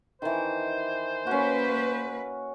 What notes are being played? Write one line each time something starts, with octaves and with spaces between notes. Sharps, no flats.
D#3 E3 C5
A#3 C#4 F#4 B4